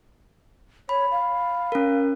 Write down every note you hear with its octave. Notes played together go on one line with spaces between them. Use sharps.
C#5 B5
F5
C#4 A#4